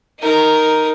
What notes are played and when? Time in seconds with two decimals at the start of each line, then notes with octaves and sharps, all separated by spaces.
0.20 D#4 A#4